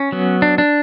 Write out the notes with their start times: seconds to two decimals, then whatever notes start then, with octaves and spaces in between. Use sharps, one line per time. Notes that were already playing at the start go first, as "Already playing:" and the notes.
Already playing: C#4
0.12 F#3 B3
0.42 D4
0.58 D4